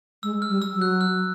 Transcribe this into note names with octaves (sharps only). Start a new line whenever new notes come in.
G#3 E6
F6
G3
E6
F#3
F#6
F6